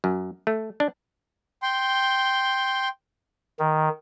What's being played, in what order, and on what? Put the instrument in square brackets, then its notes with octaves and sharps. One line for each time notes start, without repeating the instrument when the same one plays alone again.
[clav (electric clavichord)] F#2
A3
D4
[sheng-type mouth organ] G5 C6
[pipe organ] D#3